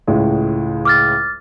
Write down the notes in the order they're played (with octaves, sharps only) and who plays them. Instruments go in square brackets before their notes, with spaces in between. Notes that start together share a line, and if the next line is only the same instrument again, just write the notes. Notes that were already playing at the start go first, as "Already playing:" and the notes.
[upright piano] C#2 A2 G#3
[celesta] D6 F6 A6